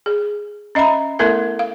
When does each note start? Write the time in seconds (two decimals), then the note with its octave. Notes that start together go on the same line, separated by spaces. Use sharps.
0.06 G#4
0.75 C#4 D#5 E5 A#5 B5
1.19 A3 B3 E4 A4 A#4 E5
1.59 F5